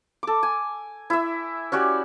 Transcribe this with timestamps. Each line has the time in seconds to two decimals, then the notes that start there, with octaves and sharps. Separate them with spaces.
0.23 A4 D6
0.43 G#5
1.10 E4 E5
1.72 C#4 F#4 G4 D5